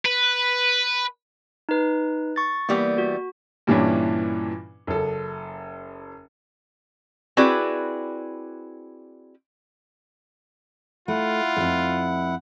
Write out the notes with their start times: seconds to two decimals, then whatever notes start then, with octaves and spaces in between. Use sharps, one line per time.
0.06 B4
1.69 D#4 B4
2.36 C#6 A6
2.69 E3 G3 A#3 B3
2.98 F#4
3.67 G2 A#2 E3 C#4 D4 E4
4.87 F#1 A4
7.37 C4 E4 F#4 G#4 B4 D5
11.08 A3 E4 F4 F#5
11.57 F2 G#2